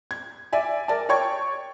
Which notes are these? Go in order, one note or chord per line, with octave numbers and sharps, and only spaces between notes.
G#6
D5 E5 G#5
A#4 D5 A5
C#5 D5 G5 C#6 G#6